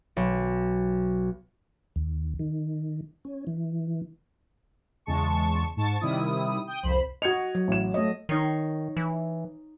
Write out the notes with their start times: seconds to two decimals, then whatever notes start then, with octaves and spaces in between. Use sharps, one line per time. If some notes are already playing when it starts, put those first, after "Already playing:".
0.17 B1
1.96 D#2
2.39 D#3
3.25 C#4
3.47 E3
5.06 E2 C#3 G#3 A5 C#6
5.76 G#2 A5 C#6 A6
6.01 C3 D#3 G3 E4 D#6
6.67 G5 D#6 G6
6.83 C2 F2 C5 B5
7.22 F#4 D#5 G#6 C#7 F7
7.55 F#3
7.68 A1 E7
7.94 A3 C#5 D#5
8.29 D#3 D#4 C#5 C7
8.97 E3